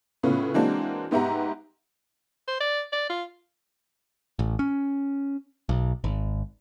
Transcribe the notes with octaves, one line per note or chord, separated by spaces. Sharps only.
A2 C#3 B3 C#4 F4
E3 G#3 A#3 C4 D4 F#4
G#2 B3 G4 E5 F#5 A#5
C5
D5
D5
F4
A1
C#4
B1
G#1